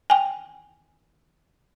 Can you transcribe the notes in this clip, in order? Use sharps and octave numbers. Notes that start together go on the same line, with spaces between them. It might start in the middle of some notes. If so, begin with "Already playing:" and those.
G5 G#5